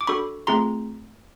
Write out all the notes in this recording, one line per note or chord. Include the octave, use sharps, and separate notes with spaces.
D6
D4 F#4 A4 B5 C#6
A3 C4 F4 G#4 A#5 C6